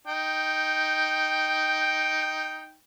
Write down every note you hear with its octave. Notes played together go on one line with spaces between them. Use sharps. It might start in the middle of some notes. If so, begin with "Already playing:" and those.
D#4 G5